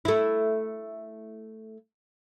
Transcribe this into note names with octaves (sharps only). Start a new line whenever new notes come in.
A3 E4